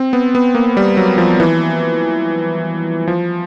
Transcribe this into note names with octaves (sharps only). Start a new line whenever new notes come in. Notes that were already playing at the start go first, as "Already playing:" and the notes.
Already playing: C4
B3
B3
A#3
G3
F#3
F3
E3
F3